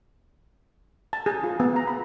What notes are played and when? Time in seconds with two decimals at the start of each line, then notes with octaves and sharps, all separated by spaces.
1.13 A5
1.26 G#4
1.44 F4
1.60 B3
1.76 A#5
1.88 B5